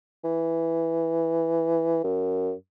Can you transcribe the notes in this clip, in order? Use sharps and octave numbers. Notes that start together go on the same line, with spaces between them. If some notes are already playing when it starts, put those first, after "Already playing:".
E3
F#2